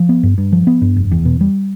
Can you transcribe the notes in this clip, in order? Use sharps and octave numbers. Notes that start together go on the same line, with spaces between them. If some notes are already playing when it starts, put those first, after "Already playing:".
Already playing: F3
B3
G2
G2
F3
B3
G2
F1
E2
B2
G3